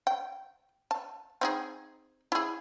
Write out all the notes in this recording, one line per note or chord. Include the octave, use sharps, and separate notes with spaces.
G5
A5
C4 D#4 G#4
E4 G#4